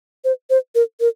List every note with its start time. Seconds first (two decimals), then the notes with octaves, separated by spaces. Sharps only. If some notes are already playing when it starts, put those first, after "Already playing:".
0.24 C5
0.50 C5
0.75 A#4
1.00 A#4